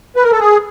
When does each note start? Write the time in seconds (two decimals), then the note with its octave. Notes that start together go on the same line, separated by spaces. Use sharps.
0.16 B4
0.23 A#4
0.32 A4
0.40 G#4